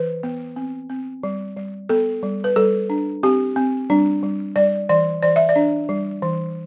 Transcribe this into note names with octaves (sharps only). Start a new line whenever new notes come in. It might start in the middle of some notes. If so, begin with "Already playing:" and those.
Already playing: E3 B4
B3
C4
C4
G3
G3
B3 A4
G3
B4
G3 A4
D4
C4 G4
C4
G3 D4
G3
G3 D5
E3 D5
E3 D5
E5
D5
D4
G3
E3